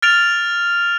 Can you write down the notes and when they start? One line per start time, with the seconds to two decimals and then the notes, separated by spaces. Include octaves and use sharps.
0.02 F6 A6 D7 F7